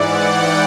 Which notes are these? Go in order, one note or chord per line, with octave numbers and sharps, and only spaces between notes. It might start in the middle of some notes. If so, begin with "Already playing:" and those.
Already playing: G#2 E3 D5 F#5
G5